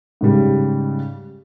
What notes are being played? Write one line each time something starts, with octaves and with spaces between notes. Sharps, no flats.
G#2 C#3 G3